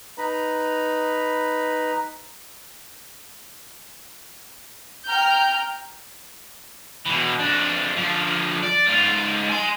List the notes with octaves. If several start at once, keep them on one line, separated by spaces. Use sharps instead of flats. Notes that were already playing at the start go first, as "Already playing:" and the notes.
D#4 B4 A#5 B5
G5 A#5 F6 G6
B2 E3
F2 D4
D3 F3
D5
G#2 F4
G#5 C6